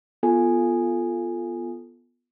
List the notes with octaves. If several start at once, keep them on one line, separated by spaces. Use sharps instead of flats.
B3 F4 A4 G#5